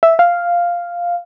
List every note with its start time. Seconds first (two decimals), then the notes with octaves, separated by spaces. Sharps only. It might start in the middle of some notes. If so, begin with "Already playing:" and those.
0.03 E5
0.19 F5